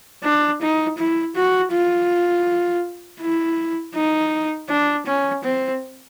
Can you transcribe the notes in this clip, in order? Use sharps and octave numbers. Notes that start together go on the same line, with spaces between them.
D4
D#4
E4
F#4
F4
E4
D#4
D4
C#4
C4